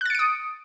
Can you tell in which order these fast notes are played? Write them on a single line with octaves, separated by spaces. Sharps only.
F#6 A6 C#7 D7 D#6